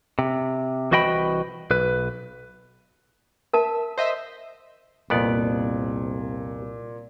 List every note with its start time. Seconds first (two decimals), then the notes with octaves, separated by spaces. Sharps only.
0.19 C3
0.91 C2 E3 F#4 D#5 G5 B5
1.71 B1 B4
3.53 A#4 E5 A5
3.98 C5 D#5 E5
5.10 C2 F2 A#2 B3 D5